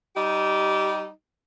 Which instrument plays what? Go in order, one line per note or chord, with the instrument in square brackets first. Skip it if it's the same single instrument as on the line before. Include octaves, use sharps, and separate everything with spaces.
[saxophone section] G3 D#4 G4